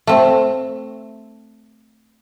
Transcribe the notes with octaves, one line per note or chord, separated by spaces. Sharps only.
A3 C4